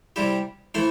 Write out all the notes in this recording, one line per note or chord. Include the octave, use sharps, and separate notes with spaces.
C3 G3 E4 G4
E3 A3 E4 C5